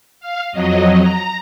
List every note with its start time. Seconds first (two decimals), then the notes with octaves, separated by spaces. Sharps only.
0.20 F5
0.52 F2 F#3 D#5
0.99 A#5